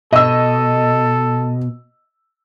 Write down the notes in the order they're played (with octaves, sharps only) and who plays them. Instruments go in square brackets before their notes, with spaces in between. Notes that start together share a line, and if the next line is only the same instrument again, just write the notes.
[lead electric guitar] B2 [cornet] A4 [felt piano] D#5 E6